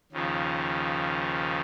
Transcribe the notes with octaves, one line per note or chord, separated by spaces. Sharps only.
D#2 C#3 F3